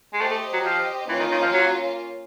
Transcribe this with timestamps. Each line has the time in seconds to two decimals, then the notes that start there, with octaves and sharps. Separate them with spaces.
0.13 G#3
0.21 A3 G4 C5 D#5
0.31 A3
0.53 F#3
0.65 F3
1.09 E3 A#3 C#4 F4
1.20 D#3
1.32 D#3
1.42 F3
1.53 F#3